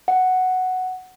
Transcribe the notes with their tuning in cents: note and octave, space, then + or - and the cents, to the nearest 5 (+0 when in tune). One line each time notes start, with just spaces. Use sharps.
F#5 +0